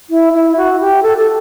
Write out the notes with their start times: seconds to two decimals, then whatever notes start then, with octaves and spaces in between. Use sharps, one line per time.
0.10 E4
0.33 E4
0.57 F#4
0.80 G4
1.03 A4
1.18 A4